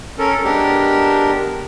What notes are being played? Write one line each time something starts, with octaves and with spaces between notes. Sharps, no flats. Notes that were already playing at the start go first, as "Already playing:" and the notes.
C#4 A4 A#4
G#3 B3 D4 G4 A#4